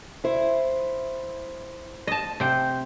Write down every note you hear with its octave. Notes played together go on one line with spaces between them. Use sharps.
E4 C5
D#5 A5
C3 G5